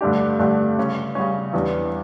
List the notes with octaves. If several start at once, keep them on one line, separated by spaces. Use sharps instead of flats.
G2 D3 A3 D4 G4
G2 D3 A3 D4 G4
C#3 G3 C#4
C#3 G3 C#4
E2 E3 G3 D4